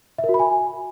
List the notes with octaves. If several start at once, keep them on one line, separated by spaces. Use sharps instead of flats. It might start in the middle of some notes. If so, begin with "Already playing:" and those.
E5
A#4
F#4
B5
G#5